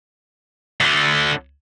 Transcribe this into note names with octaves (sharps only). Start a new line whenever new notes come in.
D2 D3